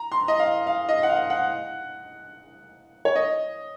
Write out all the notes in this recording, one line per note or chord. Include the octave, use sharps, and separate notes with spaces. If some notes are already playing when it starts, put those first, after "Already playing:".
Already playing: A#5
C6
D#5
F5
F5
D#5
F#5
F5
F#5
C#5
D#5